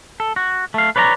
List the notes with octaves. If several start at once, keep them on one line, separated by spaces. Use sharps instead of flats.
A4
F#4
A3 F5
B4 C#5 D5 F#5 A#5